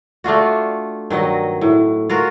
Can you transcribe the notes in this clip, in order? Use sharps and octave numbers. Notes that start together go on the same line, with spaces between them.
A3 D4 F4 F#4
G2 D#3 F#3 D#5
A2
F4 F#4 A#4